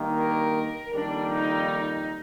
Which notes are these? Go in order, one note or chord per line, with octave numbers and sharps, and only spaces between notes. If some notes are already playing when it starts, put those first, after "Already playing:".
Already playing: G2 D#3 A#3
A#4
F2 D#3 G3 A#3 D4
D#4